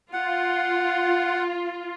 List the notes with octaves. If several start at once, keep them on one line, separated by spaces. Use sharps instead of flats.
F4 F#5